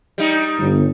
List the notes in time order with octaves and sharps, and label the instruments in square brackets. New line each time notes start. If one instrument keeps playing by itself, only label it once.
[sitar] G3 D#4
[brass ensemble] G1